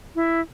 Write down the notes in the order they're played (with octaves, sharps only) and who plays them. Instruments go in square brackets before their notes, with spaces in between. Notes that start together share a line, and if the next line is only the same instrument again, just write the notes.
[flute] E4